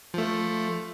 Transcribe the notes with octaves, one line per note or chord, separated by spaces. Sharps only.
F3 A3